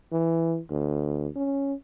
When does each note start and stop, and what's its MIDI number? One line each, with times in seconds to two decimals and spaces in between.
0.12 0.59 52
0.71 1.28 38
1.36 1.74 61